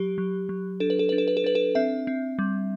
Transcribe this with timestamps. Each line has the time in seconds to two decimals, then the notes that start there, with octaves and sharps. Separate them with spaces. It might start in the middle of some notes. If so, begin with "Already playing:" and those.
Already playing: F#3 G4
0.18 F#3
0.49 F#3
0.80 D4 A4
0.90 B4
0.99 A4
1.09 D4 B4
1.18 A4
1.28 B4
1.37 A4
1.44 D4 B4
1.55 A4
1.75 C4 E5
2.07 C4
2.39 G3